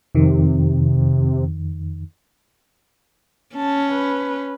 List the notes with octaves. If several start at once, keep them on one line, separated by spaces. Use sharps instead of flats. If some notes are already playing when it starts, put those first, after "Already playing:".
F2 C3 D#3
C#4 A5
B4